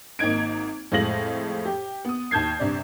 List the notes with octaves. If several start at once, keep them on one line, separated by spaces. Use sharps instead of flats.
G#1 A#3 D#4 G#6 D7
F2 A2 G#3 F5 A#6 F#7
G4
B3 D#6
D#2 A5 G6 G#6 C7
G1 C3 D5